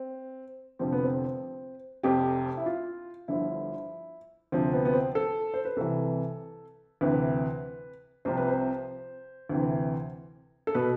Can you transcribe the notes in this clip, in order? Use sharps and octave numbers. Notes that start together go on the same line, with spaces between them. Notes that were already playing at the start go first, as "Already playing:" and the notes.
Already playing: C4
F1 F2 D3 F3 C4
B3
C4
F1 F2 C3 G4
E4
F4
G1 G2 D3 F3 E4
D2 C3 F3 C4
B3
B3
C4
A4
C5
B4
C2 C3 E3 A4
D2 C3 E3 B4
C2 C3 F3 C5
B4
C5
D2 C3 E3
A4
B2 B4